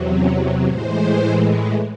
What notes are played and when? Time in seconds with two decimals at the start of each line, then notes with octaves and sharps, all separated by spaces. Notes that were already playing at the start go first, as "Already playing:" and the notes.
Already playing: E2 C3 F#3
0.13 C#4
0.66 A2 E3 G#3 C5